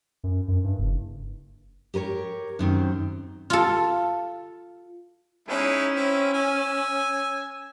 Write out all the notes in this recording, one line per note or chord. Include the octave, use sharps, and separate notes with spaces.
F#2
F#2
G2
F#1
G4 A#4 B4 C#5
F#2 D#3 C4
F4 A4
G#3 C#4 D#4 E4
C4 E4
G#5 E6